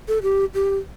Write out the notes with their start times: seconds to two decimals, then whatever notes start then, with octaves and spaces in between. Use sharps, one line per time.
0.08 A4
0.23 G4
0.54 G4